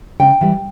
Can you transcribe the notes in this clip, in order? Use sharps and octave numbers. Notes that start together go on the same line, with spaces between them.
C#3 G5
E3 G3